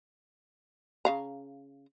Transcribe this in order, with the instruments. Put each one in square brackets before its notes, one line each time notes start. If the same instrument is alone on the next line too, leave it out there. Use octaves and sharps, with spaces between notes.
[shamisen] C#3 F5 A#5